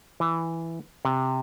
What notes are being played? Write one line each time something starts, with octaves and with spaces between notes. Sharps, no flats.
E3
C3